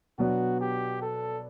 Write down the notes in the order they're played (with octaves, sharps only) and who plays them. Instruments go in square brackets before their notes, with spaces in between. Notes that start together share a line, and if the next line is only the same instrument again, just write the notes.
[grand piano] B2 F#3 B3 D4 [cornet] F#4
[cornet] G4
A4